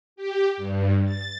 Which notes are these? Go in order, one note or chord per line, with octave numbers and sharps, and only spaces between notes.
G4
G2
A6